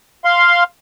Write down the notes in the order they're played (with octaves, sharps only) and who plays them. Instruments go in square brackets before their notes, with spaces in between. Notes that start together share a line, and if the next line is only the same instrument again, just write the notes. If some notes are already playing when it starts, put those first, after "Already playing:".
[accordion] F5 C6